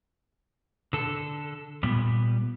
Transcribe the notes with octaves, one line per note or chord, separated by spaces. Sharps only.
D3 A4
A#2 G3 B3